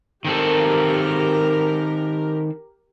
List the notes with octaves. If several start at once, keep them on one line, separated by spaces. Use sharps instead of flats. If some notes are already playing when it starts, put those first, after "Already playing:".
D#3 C4 G4 A4 A#4